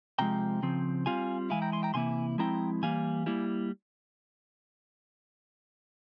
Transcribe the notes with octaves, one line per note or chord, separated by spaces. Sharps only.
C3 F3 G#3 G5 A#5
C#3 F3 C4
G3 C4 F4 F5 G#5
E3 G#3 E4 F5 G#5
G5 A#5
G#5 C6
G5 A#5
C3 E3 A#3 E4 G#5 C6
F3 G#3 C4 E4 G5 A#5
E3 G3 A#3 F5 G#5
G3 A#3 E4